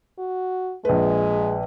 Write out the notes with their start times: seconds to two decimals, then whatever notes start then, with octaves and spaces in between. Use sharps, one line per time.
0.18 F#4
0.85 A#1 G#3 B4